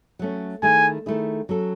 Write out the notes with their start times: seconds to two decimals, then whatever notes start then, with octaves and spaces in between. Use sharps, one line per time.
0.19 F#3 A3 C#4
0.63 D#3 A3 E4 G#4 G#5
1.06 D#3 A3 E4 G#4
1.49 F#3 C#4 F#4 A4